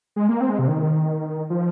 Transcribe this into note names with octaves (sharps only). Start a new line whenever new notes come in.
G#3
A#3
C4
G#3
C3
D#3
F3